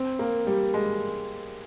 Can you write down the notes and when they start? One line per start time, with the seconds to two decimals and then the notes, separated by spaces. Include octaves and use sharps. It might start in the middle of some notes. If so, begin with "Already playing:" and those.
Already playing: C4
0.19 A#3
0.47 G3
0.74 G#3